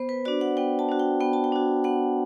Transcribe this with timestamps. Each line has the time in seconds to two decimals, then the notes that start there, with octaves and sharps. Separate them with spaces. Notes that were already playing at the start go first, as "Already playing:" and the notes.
Already playing: B3 C5
0.09 B4
0.25 D4 F#4 D5
0.41 F#5
0.57 B3 G5
0.79 A5
0.89 D4 F#4
0.99 G5
1.20 B3 G5
1.33 A5
1.44 G5
1.52 D4 F#4
1.84 B3 F#5